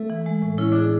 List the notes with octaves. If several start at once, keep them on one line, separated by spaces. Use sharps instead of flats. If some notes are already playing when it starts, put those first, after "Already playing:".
Already playing: A3
E3
G#3
A2
C#4 E4
D4 G#4